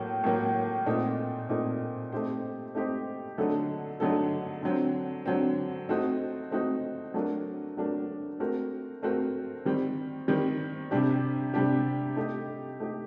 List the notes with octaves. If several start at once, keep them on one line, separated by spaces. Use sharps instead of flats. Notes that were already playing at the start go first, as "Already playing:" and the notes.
Already playing: A2 F#3 A#3
A2 F#3 A#3
A#2 A3 C4 D#4
A#2 A3 C4 D#4
A3 C4 D#4 G4 C5
A3 C4 D#4 G4 C5
D3 F#3 A3 D#4 A4
D3 F#3 A3 D#4 A4
D3 F#3 C4
D3 F#3 C4
A3 C4 D#4 F#4
A3 C4 D#4 F#4
F#3 A3 D4 F#4 A#4
F#3 A3 D4 F#4 A#4
A3 C4 F#4 A#4
A3 C4 F#4 A#4
D#3 G3 C4
D#3 G3 C4
C3 G3 D4 G4
C3 G3 D4 G4
A3 D#4 G4
A3 D#4 G4